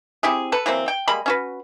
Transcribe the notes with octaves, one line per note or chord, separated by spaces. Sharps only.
C4 E4 G4 G#4
A4 B4
E3 F#3 A#3 C4
G5
G3 G#3 A#3 B5
C#4 F#4 B4